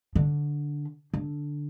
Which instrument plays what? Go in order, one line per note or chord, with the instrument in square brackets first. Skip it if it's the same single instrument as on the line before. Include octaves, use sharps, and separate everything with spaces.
[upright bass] D3
D3